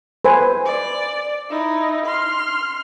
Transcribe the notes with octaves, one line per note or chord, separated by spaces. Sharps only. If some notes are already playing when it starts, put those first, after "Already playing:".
B4 C5 G#5
D5
D#4 E4
C6 F6